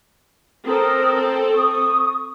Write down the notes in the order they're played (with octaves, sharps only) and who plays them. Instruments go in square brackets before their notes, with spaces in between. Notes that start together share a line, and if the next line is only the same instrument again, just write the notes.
[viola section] C4 A4 [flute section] A#4 D#6
[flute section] C#6 D#6